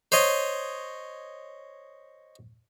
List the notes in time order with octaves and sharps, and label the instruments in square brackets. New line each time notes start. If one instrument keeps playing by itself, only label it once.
[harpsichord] C5 C#5 D#5